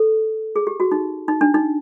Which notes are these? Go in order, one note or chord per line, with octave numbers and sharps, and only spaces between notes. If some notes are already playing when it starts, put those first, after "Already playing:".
Already playing: A4
G#4
G4
F#4
D#4
D#4
D4
D#4